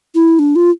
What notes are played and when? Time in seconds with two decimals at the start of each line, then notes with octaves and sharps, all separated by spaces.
0.15 E4
0.39 D4
0.56 F4